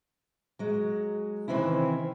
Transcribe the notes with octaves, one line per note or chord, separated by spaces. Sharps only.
F#3 G#3
C3 D#3 E3 C4 C#4 E4